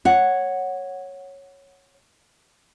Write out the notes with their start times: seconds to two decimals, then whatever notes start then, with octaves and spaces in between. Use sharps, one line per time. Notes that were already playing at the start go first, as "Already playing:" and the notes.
0.05 C#5 F#5